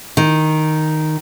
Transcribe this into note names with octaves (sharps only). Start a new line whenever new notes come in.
D#3